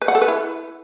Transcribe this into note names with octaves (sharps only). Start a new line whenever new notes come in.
B4
F#5
A4
B4
E4